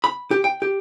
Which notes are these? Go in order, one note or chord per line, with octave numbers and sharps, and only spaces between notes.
B5
G4
G5
G4